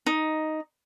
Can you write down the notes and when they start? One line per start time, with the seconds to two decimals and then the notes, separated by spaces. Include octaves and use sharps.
0.06 D#4